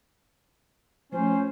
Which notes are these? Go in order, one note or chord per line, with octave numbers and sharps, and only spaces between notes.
F3 A3 C#4 F4 C5